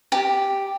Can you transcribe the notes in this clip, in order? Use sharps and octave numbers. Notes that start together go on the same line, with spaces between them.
G4